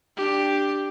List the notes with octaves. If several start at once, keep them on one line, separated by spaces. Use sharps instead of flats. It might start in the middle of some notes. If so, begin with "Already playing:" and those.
D4 G4